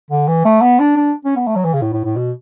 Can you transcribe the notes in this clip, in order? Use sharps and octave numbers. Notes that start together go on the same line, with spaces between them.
D3
E3
A3
B3
D4
D4
C#4
B3
A3
F#3
E3
C#3
A2
A2
A2
B2